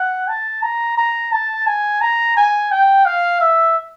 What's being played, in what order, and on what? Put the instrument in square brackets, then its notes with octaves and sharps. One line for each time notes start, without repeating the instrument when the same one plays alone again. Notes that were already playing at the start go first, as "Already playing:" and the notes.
Already playing: [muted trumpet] F#5
A5
A#5
A#5
A5
G#5
A#5
G#5
G5
F5
E5